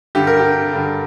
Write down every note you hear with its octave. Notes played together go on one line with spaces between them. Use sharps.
G2 D3 G4
A#4
G4
G2 D3